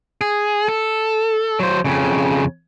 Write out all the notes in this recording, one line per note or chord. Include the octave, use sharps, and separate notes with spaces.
G#4
A4
F#3 C5
F2 C#3